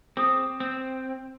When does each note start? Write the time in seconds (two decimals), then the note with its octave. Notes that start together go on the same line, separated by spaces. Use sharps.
0.17 C4 G#4 D#6
0.60 C4